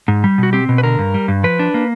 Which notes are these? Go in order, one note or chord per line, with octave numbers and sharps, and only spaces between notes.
G#2
G3
B2 F#4
C4 G4
B2
B4
D3 A#4
G2
G3
G2
F3 B4
D4
A#3